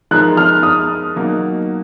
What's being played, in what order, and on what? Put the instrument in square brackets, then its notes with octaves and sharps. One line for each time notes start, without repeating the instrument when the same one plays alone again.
[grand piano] F3 G#3 D#4 A#4 [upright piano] F#6
[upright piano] F6
D#6
[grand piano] B2 F#3 A#3 D#4